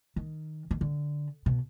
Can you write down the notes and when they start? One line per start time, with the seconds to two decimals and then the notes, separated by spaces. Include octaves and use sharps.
0.16 D#3
0.71 D#3
0.81 D3
1.46 B2